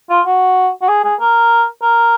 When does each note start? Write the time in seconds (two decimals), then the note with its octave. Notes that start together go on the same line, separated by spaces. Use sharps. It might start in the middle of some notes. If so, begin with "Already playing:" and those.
0.10 F4
0.26 F#4
0.82 F#4
0.88 G#4
1.04 G#4
1.20 A#4
1.82 A#4